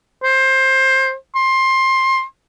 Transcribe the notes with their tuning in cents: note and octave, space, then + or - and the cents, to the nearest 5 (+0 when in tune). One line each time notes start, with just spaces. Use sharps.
C5 +20
C6 +20